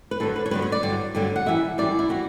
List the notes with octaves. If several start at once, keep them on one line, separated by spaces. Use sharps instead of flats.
B4
G2 D3 F#3 A4
B4
C#5
G2 D3 F#3 B4
C#5
D5
G2 D3 F#3
G2 D3 F#3
F#5
F#2 E3 G3 E5
F#2 E3 G3 D5
E4
E3 G3 F#4